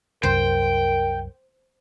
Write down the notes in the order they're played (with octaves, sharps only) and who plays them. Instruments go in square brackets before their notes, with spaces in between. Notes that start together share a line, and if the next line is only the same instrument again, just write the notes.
[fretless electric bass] C2 F#2 [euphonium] A#4 [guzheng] C5 [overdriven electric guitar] G5